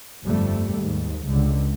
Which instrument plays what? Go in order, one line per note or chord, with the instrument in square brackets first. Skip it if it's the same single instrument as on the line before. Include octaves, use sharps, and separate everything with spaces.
[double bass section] G1 F2 G3 A3
D#2 G#2
C#2 D3